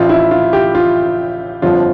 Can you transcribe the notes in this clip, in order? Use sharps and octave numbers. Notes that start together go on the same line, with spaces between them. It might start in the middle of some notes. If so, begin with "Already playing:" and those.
Already playing: A1 A2 F3 F4
E4
F4
G4
F4
G1 F2 D3 F3 F4